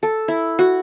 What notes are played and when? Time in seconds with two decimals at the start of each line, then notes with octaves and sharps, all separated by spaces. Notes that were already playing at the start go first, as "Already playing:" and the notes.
0.03 A4
0.28 E4
0.59 F#4